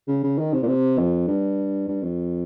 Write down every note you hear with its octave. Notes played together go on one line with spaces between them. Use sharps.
C#3
C#3
D#3
C3
A#2
C3
F2
G2
G2
F2